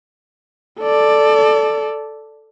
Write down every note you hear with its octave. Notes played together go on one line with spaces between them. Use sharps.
A4 D5